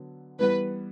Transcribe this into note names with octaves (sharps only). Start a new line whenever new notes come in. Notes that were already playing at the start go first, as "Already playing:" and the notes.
Already playing: D3 F#3 B3
E3 G3 B3 B4